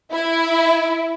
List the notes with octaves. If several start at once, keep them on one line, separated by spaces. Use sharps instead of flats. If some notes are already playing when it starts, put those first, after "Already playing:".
E4